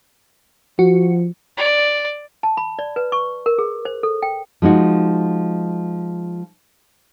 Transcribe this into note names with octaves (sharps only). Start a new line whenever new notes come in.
F3 F#4
D5
A5
B5
D5
B4
C#6
A#4
G#4
C5
A4
G5
F3 G#3 D#4 F#4